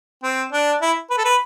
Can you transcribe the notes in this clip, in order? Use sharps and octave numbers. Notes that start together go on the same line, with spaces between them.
C4
D4
E4
B4
A4
B4